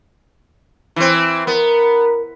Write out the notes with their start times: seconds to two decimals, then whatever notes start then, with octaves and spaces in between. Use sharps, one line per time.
0.96 E3 C4
1.47 B3 A#4